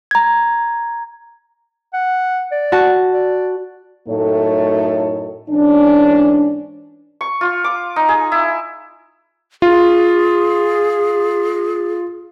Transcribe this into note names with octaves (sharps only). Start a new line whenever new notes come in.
A#5 G#6
F#5
D5
F#4 A5
D5
F#2 A2 A3 D#4 A4 C#5
G#2 E3 C#4 D4
C#6
F4
D6
D#4
G#4
E4
F4 G#4